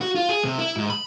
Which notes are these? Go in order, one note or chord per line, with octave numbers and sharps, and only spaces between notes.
F#4
F4
G#4
C3
E4
G#2
B5